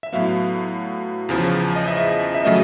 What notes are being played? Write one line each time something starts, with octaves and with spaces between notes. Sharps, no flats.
E5
A2 F#3 B3 F5
E2 C#3 F3
D#5
E5
E5
C#3 F#3 A3 D#5